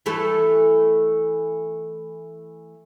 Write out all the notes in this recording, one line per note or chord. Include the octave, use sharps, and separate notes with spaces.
E3 A3 A4